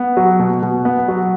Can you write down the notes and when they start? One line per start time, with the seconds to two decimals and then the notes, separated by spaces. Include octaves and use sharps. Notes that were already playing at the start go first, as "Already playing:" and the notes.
Already playing: B3
0.17 F#3
0.39 B2
0.62 B2
0.85 B3
1.08 F#3